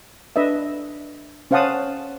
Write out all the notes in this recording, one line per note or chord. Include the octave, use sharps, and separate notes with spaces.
D4 B4 D#5 E5
C#4 C5 F5 F#5 A5 D#6